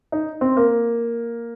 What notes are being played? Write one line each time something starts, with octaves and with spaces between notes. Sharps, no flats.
D#4
C4
A#3